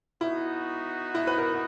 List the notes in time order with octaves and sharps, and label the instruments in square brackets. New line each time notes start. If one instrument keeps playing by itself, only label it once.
[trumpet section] B3 D#4 F#4 [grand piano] E4
[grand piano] E4
B4
A#4